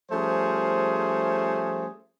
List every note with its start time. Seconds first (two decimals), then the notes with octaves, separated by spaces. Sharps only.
0.11 F3 G3 A3 C#4 G#4 C5